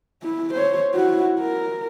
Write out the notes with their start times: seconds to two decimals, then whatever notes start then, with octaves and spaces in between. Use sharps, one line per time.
0.23 E4
0.54 C5 C#5
0.95 E4 F#4
1.40 A#4